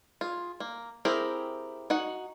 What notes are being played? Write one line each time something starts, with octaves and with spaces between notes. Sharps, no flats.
F4 G#4
A#3
C4 E4 G4 G#4 A#4
D#4 F#4 F#5